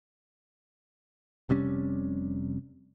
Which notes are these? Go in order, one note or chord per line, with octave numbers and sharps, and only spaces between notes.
F1 C3 G3 C#4